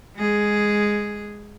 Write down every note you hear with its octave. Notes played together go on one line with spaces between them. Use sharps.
G#3 G#4